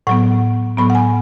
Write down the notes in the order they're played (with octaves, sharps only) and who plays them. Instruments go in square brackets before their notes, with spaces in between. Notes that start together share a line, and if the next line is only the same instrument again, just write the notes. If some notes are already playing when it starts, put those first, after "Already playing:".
[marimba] A2 F#3 B3 F#5
A2 F#3 B3 B5
F#5
G#5